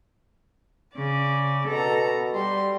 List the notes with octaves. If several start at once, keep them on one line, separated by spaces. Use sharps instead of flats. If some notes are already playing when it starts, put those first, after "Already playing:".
C#3 D5
B2 A4 A#5
G3 C6